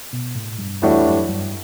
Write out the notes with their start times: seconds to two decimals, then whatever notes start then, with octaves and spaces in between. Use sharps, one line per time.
0.13 B2
0.35 A2
0.58 G2
0.82 E2 A2 E3 G3 D4 F#4
1.06 F#2
1.29 G2